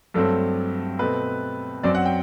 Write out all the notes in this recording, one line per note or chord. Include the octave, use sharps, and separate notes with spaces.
G2 F#3 A3 C4 A4
B2 A3 C4 B4
F#2 F#3 C4 D5
F#5
G5